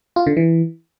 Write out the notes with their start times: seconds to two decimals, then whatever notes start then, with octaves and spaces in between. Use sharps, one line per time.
0.16 F4
0.27 D3
0.37 E3